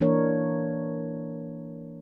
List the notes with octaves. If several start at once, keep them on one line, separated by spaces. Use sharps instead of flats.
E3 A#3 D4 A#4 C#5